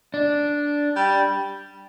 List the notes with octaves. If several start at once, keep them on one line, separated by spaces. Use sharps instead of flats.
D4
G3